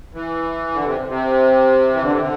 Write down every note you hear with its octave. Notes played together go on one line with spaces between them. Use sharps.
E3
D3
C3
C3
E3
D3
C3
D3